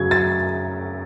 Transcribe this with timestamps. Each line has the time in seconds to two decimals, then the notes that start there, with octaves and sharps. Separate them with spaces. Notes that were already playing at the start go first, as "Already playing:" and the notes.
Already playing: F#2 C#3 F#3 G#6
0.11 A6